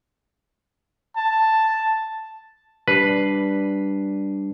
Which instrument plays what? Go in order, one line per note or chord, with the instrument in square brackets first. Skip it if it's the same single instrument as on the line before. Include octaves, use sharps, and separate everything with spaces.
[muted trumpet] A5
[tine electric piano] G3 D4 C7 [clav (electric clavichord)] B4